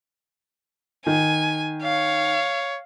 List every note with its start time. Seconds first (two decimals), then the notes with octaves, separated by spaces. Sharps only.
1.07 D#3 G#5
1.83 C#5 F5